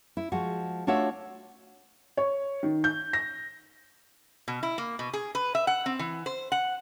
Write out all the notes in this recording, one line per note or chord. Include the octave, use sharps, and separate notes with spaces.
E4
F3 G#3 F#4
A3 D4 F4 F#4 C#5 E5
C#5
D#3
G6
A#6
B2
E4
A#3
B2
G#4
B4
E5
F#5
C4
E3
C5
F#5